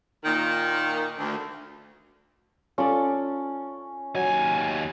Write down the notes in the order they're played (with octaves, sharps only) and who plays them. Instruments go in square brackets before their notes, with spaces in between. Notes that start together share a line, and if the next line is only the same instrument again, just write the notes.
[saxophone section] A#2 D#3
D2
[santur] C#4 [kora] F4 A4 D5
[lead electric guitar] D#2 G#5 [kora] F#3